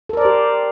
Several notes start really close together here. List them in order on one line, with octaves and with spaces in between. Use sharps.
A4 A#4 D5 C5 G4